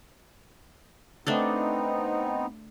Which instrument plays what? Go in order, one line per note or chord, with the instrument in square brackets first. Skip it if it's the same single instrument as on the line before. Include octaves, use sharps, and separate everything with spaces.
[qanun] A3 D4 A4 [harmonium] B3 C4 D#4